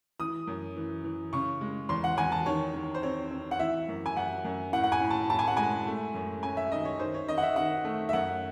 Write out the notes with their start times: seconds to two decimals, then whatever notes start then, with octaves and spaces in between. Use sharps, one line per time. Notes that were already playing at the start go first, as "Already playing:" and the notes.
0.19 E3 D#6
0.47 F#2
0.76 E3
1.04 E3
1.33 C#3 C#6
1.61 G#3
1.89 E2 C6
2.04 F#5
2.17 E2 G#5
2.32 A5
2.46 D#3 C#5
2.74 D#3
2.94 C5
3.03 C4 C#5
3.31 C4
3.51 F#5
3.59 E3 E5
3.88 F#2
4.06 G#5
4.16 F#2 F#5
4.44 F#2
4.73 A2 F#5
4.84 F#5
4.92 G#5
5.01 A2
5.11 A5
5.30 A2 A5
5.39 G#5
5.48 F#5
5.57 G#3 G#5
5.87 A3
6.14 F#2
6.43 C#4 G#5
6.57 E5
6.72 D#3 D#5
6.85 C#5
6.99 D#3 C5
7.14 C#5
7.28 D#3 D#5
7.38 F#5
7.43 E5
7.56 D#3 F#5
7.85 A3
8.09 E5
8.13 F#2 F#5